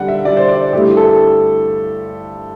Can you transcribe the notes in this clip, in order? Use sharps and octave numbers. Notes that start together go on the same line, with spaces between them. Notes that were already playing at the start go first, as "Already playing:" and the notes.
Already playing: D3 G3 D4 F#5 G5
E5
D3 G3 D4 D5
C5
D5
G2 D3 A3 E4 G4
A4